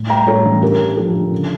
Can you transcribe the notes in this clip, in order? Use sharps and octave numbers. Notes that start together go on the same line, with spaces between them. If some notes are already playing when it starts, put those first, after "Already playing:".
Already playing: A2
G3 G5 A#5
A2 A4 C#5
A1
D2 G4 A#4
D3
F3 A4
D3
C#3